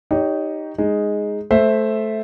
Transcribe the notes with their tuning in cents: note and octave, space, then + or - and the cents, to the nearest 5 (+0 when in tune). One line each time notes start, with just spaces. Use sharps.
D#4 +0 G4 +0 C#5 +30
G#3 +0 D#4 +0
A3 -15 C5 +0 E5 +0